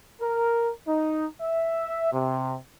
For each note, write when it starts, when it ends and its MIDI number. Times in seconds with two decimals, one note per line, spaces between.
0.20 0.70 70
0.87 1.26 63
1.41 2.10 76
2.12 2.55 48